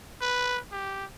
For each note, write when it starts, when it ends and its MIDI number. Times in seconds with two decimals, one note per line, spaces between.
0.21 0.58 71
0.72 1.05 67